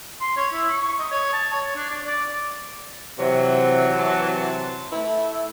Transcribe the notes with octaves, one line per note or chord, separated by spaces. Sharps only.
C6
C#5
E4
C#6
D#5
C#5
A5
C#5
D4
D5
D5
C3 E3 F#3
C3 A5 C6
A3 E4